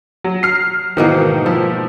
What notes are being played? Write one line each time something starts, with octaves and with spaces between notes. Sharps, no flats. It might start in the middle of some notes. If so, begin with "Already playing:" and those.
F#3
F6 C7
G#2 B2 D#3 E3 A#3
F3 E4